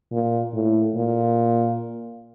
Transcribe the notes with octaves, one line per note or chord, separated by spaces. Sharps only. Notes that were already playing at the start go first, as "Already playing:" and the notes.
A#2
A2
A#2